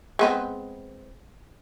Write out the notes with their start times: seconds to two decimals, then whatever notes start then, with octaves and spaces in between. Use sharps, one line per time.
0.19 G#3 B3 C4